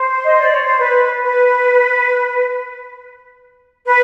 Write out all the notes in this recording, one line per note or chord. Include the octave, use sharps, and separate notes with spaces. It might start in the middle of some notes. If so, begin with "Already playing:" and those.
Already playing: C5
D#5
D5
C#5
C5
B4
B4
B4